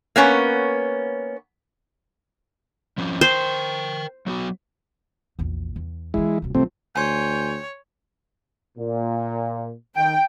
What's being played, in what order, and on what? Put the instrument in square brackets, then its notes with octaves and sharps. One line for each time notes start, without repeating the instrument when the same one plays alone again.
[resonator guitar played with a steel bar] A#3 B3 C#4 C#5
[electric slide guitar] F3 C4 C#4
[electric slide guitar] A#4 G5 [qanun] C5
[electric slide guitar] F#3 B3 F#4
[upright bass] A#1 E2
E2
[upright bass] D#3 E3 [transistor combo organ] G#3 E4
[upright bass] D1 B1
[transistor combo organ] C3 A3 C4 [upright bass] F3 F#3
[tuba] D2 [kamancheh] C#5 [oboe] G5 [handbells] G#5 C6
[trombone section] A#2
[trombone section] D#3 [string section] G5